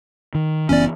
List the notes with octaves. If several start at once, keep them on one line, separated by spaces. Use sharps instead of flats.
D#3
F#1 E3 B3 C#4 D5